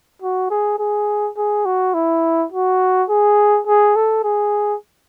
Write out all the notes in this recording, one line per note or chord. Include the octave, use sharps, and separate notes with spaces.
F#4
G#4
G#4
G#4
F#4
E4
F#4
G#4
G#4
A4
G#4